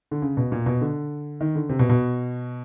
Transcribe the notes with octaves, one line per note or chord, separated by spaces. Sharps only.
D3
C#3
B2
A#2
B2
D3
D#3
D3
C3
B2
B2